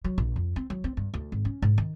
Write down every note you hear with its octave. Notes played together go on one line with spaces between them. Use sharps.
F#3
A#1
F2
C4
F#3
C4
G2
D2
G#1
C#4
G#2
D#3